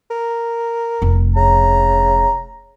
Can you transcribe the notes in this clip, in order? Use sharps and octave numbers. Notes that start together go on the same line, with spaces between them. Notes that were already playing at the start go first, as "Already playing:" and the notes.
A#4
F1 A3
C#3 A#5